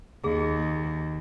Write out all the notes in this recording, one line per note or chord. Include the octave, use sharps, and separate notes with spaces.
D#2 G#4